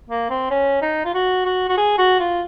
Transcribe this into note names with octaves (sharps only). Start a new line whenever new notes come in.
A#3
C4
C#4
D#4
F4
F#4
F#4
F#4
G#4
F#4
F4